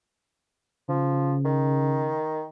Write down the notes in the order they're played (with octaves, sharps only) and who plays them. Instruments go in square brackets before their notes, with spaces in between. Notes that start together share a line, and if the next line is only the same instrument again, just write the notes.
[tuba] C#3 [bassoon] F3
[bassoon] D#3